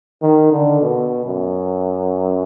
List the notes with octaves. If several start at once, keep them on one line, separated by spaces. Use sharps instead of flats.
D#3
D3
B2
F#2